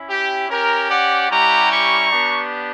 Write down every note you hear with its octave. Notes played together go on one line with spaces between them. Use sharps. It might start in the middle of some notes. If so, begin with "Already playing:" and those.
Already playing: C#4 E4
G4
C#4 G4 A#4
D5 F#5
G3 C#4 E4 G4 F#5 A#5
A#5 C#6
B3 D4 G4